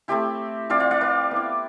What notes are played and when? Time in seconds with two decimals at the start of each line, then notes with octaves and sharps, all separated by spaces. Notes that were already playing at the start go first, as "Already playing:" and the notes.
0.08 A3 C4 E4 G4
0.70 F3 C4 E4 D5 F5
0.80 D5 F5
0.91 D5 F5
1.01 B4 D5
1.31 B3 E4